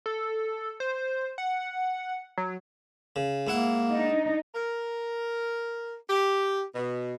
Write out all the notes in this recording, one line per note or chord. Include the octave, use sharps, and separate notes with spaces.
A4
C5
F#5
F#3
C#3
G#2 A#3 E4 F#5
D4 D#4
A#4
G4
B2